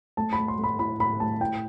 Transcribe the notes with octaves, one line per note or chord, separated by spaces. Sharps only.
A3 A5
B5
A3
C6
A3
B5
A2 B5
A2 B5
A3 A5
A2 G5